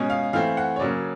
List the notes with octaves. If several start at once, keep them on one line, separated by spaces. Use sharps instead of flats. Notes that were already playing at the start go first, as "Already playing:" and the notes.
Already playing: B2 G#3 C#4
F5
E3 A3 C4 F5
F#5
C#5
C#3 F#3 A#3 D5